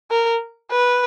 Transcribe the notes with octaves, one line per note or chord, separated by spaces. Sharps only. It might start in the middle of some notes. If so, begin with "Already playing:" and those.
A#4
B4